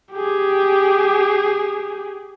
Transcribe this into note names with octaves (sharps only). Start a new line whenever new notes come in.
G4 G#4